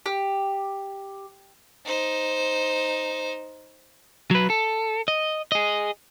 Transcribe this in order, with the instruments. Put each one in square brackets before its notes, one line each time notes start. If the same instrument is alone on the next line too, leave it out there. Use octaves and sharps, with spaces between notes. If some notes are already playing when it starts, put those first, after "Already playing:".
[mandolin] G4
[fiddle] D#4 C5
[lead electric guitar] F#3 B4
A4
D#5
G#4 D#5